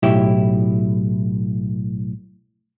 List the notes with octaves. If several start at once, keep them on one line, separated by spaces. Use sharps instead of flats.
B1 A2 E4 G4